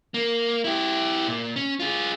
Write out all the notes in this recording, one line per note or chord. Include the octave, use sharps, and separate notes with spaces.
A#3
E4 G4
A#2
C#4
F4 G#4